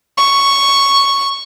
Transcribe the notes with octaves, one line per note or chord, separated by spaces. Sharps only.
C#6